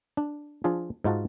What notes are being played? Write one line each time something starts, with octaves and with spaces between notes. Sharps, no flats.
D4
F3 D4 F4 G#4
G#2 D#4 F4 F#4 A5